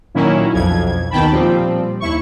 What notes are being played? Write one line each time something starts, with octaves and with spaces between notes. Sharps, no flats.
A#2 D#3 F#3 A#3 C#4 E4
B1 F2 G#6
D#2 B2 D#3 G5 A5 B5
A#2 F3 G3 C4
D#2 E4 C#6